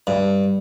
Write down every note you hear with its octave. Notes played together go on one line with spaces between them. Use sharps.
G2